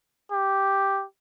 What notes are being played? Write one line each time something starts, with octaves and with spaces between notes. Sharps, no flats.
G4